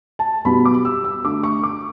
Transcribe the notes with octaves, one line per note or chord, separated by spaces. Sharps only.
A5
B2 G3 B3 B5
D6
E6
E6
D3 A3 D6
C#6
D6